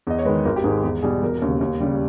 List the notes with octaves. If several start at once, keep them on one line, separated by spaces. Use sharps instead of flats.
E2 D#5
C#5
D#3 G#3 B4
G#1 A#4
G4
G#2 D#3 G#3 G#4
E2
B2 G3 G#4
E1 A#4
D#2 C#3
D#2
C#3 G3